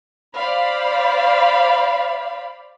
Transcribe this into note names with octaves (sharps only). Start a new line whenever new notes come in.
C5 D5 F5 B5